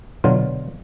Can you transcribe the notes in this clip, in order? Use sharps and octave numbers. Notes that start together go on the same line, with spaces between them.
B2 D3 F#3 F4